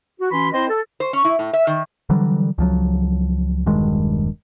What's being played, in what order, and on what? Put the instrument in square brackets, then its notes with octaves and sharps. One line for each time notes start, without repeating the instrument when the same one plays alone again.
[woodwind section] F#4
E3 C#4 F#4 B5 C6
C4 E4 C5 D#5 C6
A4
[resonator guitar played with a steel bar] C5
C#4
E4
A2
E5
D#3
[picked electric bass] D3 E3 F#3 G3
C#2 F3 F#3
E1 G2 D#3 G#3